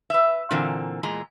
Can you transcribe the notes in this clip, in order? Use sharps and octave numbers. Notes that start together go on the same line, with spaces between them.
B4 E5
A#2 D3 E3 A#3 C4
E2 A#2 G#3 A#5